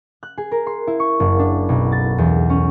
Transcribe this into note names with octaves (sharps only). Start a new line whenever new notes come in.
F#6
G#4
A#4
C6
E4
C#6
F#1
D4
B1
A6
E2
C#4